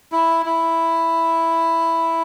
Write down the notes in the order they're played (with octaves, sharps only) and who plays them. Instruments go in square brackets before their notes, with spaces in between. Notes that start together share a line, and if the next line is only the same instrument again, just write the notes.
[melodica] E4
E4